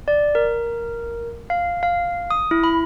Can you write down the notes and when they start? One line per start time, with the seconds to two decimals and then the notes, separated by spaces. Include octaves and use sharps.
0.08 D5
0.35 A#4
1.50 F5
1.83 F5
2.30 D#6
2.51 E4
2.64 B5